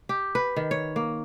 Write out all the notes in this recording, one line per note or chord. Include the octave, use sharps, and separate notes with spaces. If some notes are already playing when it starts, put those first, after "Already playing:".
G4
B4
D#3
C#5
A#3